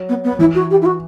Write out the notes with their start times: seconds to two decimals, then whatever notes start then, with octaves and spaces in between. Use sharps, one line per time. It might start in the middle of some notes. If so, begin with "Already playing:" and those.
Already playing: F#3
0.09 B3
0.24 B3
0.39 E3 E4
0.55 F#4
0.70 G4
0.81 E4
0.85 F#4